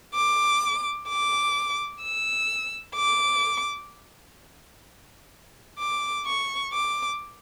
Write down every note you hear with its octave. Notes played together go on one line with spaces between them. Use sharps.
D6
D6
E6
D6
D6
C#6
D6